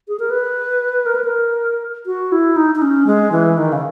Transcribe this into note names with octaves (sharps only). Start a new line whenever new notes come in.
G#4
A#4
B4
A#4
B4
A#4
F#4
E4
D#4
D#4
C#4
G#3
E3
D#3
C#3